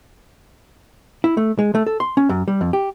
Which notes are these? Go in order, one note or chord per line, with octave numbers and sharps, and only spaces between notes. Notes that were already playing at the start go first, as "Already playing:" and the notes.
E4
A3
G#3
A3
A4
C6
C#4
F#2
G3
F2
G4